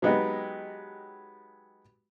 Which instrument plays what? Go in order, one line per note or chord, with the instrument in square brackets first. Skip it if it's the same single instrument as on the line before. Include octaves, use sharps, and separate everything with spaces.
[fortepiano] F#3 G#3 B3 D#4 G4 D#5